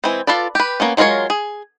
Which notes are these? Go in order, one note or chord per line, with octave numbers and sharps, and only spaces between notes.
E3 G#3 C4
F4 A4 B4 D5
G4 B4
A#3 B3 C#4
F#3 G#3 F4 A#4 C#5
G#4